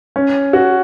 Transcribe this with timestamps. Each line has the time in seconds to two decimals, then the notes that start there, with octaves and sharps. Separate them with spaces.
0.16 C#4
0.53 F#4